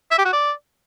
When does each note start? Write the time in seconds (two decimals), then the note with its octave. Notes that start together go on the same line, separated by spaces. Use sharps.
0.11 E5
0.18 G4
0.25 F#4
0.33 D5